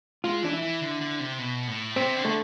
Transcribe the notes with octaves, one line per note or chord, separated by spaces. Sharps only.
G#3 F4
E3 D4
E4
E3
D3
D3
C3
B2
A2
C3 C4
D3
A3